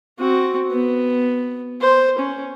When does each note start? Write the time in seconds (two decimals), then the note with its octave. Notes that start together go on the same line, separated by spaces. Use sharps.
0.19 C4 F#4
0.71 B3
1.81 C5
2.18 C#4